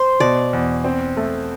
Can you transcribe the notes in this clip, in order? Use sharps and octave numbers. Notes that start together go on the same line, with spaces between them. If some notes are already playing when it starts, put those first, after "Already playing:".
Already playing: C5
B2 D5
E2
C4
A3